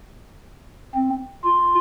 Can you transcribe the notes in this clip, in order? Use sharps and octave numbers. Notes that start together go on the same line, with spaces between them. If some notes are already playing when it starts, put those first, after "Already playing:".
C4
F4